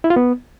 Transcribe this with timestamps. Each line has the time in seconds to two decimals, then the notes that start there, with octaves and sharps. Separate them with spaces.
0.04 E4
0.10 F4
0.16 B3